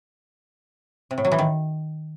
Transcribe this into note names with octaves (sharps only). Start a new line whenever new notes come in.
C3
A2
F#3
E3
D#3